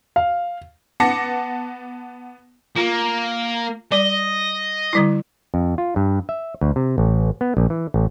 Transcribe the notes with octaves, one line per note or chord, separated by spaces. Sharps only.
F5
B3 F#5 A5 D6 A#6 C#7
A#3 F4
G3 D5 D#5
D3 G3 E4
F2
F4
G2
E5
D2
C3
A1
B3
A#1
E3
A1